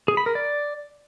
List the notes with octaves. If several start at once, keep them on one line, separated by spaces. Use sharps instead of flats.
G#4
B5
A#4
D5